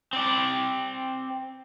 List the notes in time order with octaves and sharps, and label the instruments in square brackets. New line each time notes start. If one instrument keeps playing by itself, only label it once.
[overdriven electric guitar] C4 D5